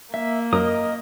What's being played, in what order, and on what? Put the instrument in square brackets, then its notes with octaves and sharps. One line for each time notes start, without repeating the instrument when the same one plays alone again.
[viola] A#3 [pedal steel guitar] E5
[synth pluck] F#2 [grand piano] A#4 [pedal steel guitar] D#5 D#6